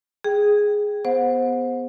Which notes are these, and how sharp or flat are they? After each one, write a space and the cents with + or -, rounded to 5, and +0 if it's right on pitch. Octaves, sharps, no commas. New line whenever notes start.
G#4 +0 G5 +0
B3 +10 C5 +0 F#5 -35